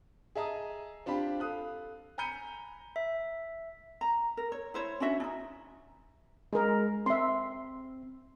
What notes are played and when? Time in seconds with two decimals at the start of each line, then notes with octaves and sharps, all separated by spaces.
0.35 G#4 D#5 E5 A5 A#5 D#6
1.06 C4 D4 F4 G4 B5
1.40 A4 F5 D#6 F#6
2.18 G#5 A#5 B5 G6 C#7 D#7
2.96 E5
4.01 A#5
4.37 A#4
4.52 C#5
4.74 E4 C5 C#5
5.00 C#4 D4 F#4 E5
5.20 D4 D#4
6.53 G#3 G#4 A#4
7.06 C4 E5 C6